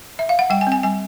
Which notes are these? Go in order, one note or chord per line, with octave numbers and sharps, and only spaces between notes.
E5
F5
F#5
G3 G5
G#5
C4
G#5
G3 G#5